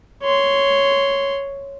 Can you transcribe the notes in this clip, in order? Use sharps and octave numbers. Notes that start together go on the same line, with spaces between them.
C#5 C6